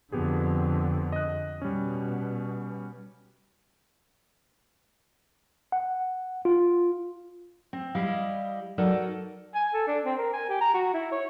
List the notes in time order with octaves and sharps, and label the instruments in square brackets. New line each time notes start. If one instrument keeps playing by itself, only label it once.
[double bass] F2 D3 [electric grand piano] B3 G4 G#4
[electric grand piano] D#5 F#6
[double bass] B2 [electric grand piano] G3 C#4
[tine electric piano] F#5
F4
[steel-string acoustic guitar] C4
G3 E4 D#5 F5
F#3 D#4 A4 A#4 D5
[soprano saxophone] G#5
A4
D4
C4
A#4
G#5
G4
A#5
F#4
E4
C#5